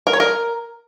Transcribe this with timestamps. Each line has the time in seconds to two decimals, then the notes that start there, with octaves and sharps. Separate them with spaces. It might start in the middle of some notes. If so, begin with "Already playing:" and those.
0.07 A#4
0.13 C#5
0.20 A#4